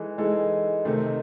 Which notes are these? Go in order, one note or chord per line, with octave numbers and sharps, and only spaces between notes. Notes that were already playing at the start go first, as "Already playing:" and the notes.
Already playing: E3 G#3 D#4 A4
E3 G#3 D#4 A4
C3 D#3 A3 C4 D#4